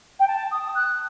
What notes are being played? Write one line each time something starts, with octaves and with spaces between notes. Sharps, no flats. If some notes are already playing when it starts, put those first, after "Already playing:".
G5
A5
D#6
F#6